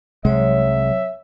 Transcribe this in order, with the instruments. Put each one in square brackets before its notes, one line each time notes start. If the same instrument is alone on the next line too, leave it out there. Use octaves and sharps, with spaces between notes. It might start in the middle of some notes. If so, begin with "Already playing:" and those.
[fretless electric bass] C2 C3 G#3 [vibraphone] F#3 C#5 [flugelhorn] E5